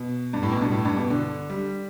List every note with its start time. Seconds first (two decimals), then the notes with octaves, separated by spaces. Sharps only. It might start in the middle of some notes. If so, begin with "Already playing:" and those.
Already playing: B2
0.33 G2
0.43 A2
0.52 B2
0.62 G2
0.72 A2
0.85 G2
0.97 B2
1.10 D3
1.50 G3